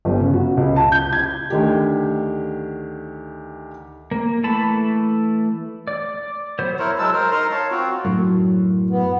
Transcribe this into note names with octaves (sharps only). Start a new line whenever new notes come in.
G1
C#3
F#4
C#2
A5
G6
G#6
D2 D#3 G4
A#3
E3 A3 A5 B5
D5
F#3 B3 C5
E4 A#4 C5 C#5
F#3 G#3 A5 E6
A#4 C5
D#4 A#4 A#5 C6
C#5 F5 A5
C4 F4 F#4
F#2 A2 F#3
B3